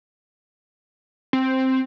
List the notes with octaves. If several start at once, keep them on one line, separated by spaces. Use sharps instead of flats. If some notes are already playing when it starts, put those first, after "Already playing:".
C4